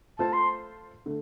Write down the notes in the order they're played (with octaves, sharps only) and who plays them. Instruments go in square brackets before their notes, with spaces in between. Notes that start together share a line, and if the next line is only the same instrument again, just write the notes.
[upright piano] A3 F4 A4 C5 [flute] A5
[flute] C6
[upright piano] D3 A3